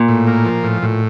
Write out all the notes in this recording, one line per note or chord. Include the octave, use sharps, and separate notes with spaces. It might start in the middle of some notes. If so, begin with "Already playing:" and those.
Already playing: A#2
A2
A#3
F3
A2
A2